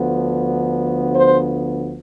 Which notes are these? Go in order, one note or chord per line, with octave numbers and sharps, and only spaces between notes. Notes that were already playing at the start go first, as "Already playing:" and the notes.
Already playing: D2 D3 F3 B3
C5